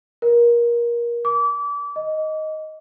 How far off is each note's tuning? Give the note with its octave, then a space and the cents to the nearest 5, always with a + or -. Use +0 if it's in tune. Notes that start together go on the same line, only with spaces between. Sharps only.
A#4 +25
D6 -30
D#5 +5